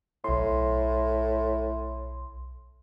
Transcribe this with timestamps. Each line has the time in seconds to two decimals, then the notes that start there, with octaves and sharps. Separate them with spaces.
0.24 B1 A2 C6